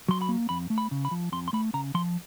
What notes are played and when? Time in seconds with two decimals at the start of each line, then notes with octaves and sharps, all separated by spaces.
0.08 F#3 C6
0.22 B5
0.29 A#3
0.49 F2 B5
0.70 A3
0.78 B5
0.91 C#3
1.05 B5
1.11 F3
1.32 F2 C6
1.48 C6
1.53 A3 B5
1.74 C#3 A#5
1.94 F3 C6